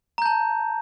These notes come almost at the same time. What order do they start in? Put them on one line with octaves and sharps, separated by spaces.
A#5 G6 A5